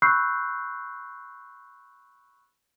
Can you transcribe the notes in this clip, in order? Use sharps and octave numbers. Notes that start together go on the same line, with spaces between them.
B5 C#6 E6 F#6 G6 C7